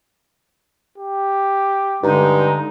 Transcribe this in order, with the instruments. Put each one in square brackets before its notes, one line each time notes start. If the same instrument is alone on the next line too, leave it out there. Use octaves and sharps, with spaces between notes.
[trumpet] G4
[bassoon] G2 [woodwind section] D3 G#3 D#4